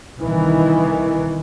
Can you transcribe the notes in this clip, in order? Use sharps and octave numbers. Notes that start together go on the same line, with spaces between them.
C2 D#3 E3